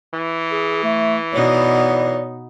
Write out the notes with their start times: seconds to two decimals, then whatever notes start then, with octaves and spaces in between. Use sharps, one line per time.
0.14 E3
0.51 G#4
0.84 A3
1.33 B2 B3 D#4 C#5 D5